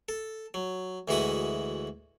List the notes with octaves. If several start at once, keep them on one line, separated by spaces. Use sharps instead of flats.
A4
F#3
D2 E3 G#3 F#4 B5 D#6